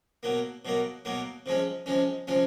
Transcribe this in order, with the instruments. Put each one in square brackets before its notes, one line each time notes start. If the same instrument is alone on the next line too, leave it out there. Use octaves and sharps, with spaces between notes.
[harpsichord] B2 F#3 A#3
B2 F#3 A#3
B2 F#3 A#3
C3 F3 G#3 C#4
C3 F3 G#3 C#4
C3 F3 G#3 C#4